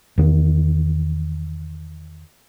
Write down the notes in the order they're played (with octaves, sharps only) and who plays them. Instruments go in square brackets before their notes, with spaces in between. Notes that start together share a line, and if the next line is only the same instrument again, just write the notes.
[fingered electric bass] E2 D#3